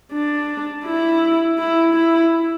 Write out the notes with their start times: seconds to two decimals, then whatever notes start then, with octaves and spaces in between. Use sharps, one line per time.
0.12 D4
0.85 E4
1.58 E4
1.94 E4